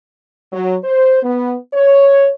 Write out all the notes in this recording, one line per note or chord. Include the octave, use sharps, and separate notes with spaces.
F#3
C5
B3
C#5